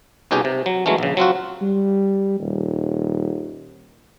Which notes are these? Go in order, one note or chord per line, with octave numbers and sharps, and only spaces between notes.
C2 B2 C#4 D#4 G4 G#4
C3
F#3
E3 F#3 G#3 A3 C#4
A#1 C#3
F#3 C4 F4 F#4
G3
D#1